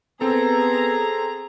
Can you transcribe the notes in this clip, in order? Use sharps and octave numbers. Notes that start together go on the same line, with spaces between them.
B3 C4 G#4 A4 A#5